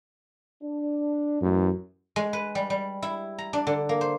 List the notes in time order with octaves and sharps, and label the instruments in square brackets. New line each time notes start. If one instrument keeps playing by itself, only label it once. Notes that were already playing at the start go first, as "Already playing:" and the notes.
[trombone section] D4
[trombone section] A1 [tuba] F#2
[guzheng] G#3
B4
G3
G3
E4
A#5
D4
D3
A#3
C5